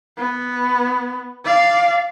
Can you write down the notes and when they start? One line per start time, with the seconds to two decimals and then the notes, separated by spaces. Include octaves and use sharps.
0.17 B3
1.45 D5 F5